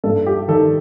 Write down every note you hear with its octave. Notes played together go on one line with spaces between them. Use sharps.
G2 A4
G4
D#3 A4